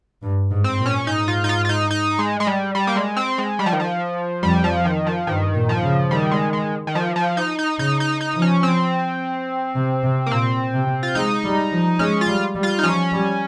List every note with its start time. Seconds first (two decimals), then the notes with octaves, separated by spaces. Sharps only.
0.22 G2
0.50 G#2
0.64 C4
0.78 A#2
0.86 C#4
1.07 G#2 D#4
1.28 F4
1.44 D#4
1.49 F4
1.65 F4
1.69 D#4
1.91 D#4
2.19 G#3
2.40 G#3
2.47 G3
2.75 G3
2.87 A#3
2.96 G#3
3.16 C4
3.38 G#3
3.59 G3
3.66 F3
3.73 D#3
3.80 F3
4.43 F2 G3
4.64 F3
4.85 D#3
5.07 F3
5.27 G2 D#3
5.55 A#2
5.69 F3
5.83 C#3
6.11 D#3 G3
6.31 G#3
6.53 G#3
6.87 D#3
6.95 F3
7.16 F3
7.37 D#4
7.59 D#4
7.79 C#3 D#4
8.00 D#4
8.21 D#4
8.35 F3
8.42 C#4
8.63 C4
9.75 C3
10.03 C3
10.26 A#3
10.31 A#2 C4
10.73 C3
11.03 F4
11.15 G#3 D#4
11.44 G3
11.72 F3
11.99 G#3 C#4
12.21 F4
12.27 G3
12.55 G3
12.63 F4
12.79 D#4
12.83 F3 C#4
13.12 G3